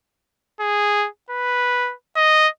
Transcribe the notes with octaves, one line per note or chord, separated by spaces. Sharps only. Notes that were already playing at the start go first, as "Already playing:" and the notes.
G#4
B4
D#5